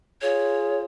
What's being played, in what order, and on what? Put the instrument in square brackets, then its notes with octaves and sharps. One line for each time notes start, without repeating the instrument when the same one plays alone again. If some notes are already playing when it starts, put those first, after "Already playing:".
[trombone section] F4 G#4 [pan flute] C#5